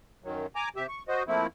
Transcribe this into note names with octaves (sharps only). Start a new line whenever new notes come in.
F#2 D#3 F#3
G#5 A#5 D6
C3 G4 E5
C#6
F#4 C5 D#5
F3 A3 A#3 C4 E4